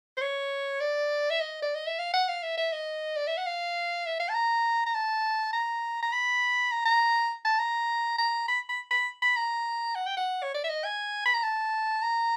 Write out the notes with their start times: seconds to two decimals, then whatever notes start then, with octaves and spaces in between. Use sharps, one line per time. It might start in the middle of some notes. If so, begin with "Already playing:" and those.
0.17 C5
0.22 C#5
0.80 D5
1.30 E5
1.41 D#5
1.62 D5
1.75 D#5
1.87 E5
1.99 F5
2.14 F#5
2.29 F5
2.43 E5
2.57 E5
2.72 D#5
3.17 D5
3.27 E5
3.37 F#5
3.47 F5
4.06 E5
4.20 F5
4.29 A5
4.34 A#5
4.86 A#5
4.95 A5
5.53 A#5
6.02 A#5
6.12 B5
6.72 A#5
6.85 A#5
7.45 A5
7.59 A#5
8.19 A#5
8.48 B5
8.69 B5
8.91 B5
9.22 B5
9.36 A#5
9.95 F#5
10.06 G5
10.17 F#5
10.43 C#5
10.54 D5
10.64 E5
10.69 D#5
10.85 G#5
11.26 B5
11.34 A#5
11.43 A5
12.03 A#5